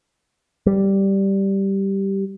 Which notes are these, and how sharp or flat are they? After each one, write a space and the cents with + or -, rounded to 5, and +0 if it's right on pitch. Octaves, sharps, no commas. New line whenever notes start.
G3 -5